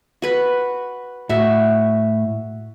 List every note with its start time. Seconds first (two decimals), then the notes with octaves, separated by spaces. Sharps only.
0.22 F#4 B4 B5
1.29 A2 F#4 E5